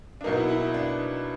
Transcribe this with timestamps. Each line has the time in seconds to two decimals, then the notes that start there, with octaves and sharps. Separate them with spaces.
0.21 D4
0.24 B2 F#3 A#3 D#4
0.37 E4
0.49 E4
0.62 E4
0.74 D4